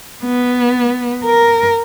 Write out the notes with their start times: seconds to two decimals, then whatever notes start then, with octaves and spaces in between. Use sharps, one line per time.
0.24 B3
1.24 A#4